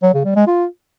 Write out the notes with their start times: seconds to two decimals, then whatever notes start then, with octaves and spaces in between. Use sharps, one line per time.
0.03 F#3
0.14 C#3
0.25 G3
0.36 G#3
0.47 F4